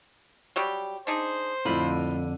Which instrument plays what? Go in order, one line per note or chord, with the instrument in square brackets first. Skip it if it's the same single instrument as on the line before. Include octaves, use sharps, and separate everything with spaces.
[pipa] F#3 G3 G4
[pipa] D4 D#4 G#4 [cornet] C5
[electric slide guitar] F2 D3 [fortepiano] A2 F4 [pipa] B5